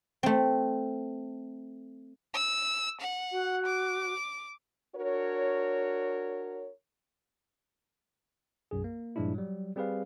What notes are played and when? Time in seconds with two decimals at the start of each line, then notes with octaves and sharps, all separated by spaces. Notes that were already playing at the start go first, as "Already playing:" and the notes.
0.23 A3 C4
2.34 E6
3.01 F#5
3.32 F#4
3.66 D6
4.96 D4 F#4 A#4 C#5
8.71 B1 F#2 G#4
8.84 A#3
9.16 G2 A#2 F3 G#3 D4 E4
9.35 F#3 G3
9.76 G3 C4 G#4 B4 F5